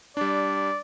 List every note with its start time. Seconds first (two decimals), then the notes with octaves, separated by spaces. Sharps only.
0.17 G3 D4 D5